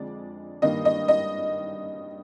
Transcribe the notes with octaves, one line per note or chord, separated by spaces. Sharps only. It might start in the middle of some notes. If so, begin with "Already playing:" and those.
Already playing: F2 D3 G#3 D4 D5
G2 D#3 A#3 D#5
D#5
D#5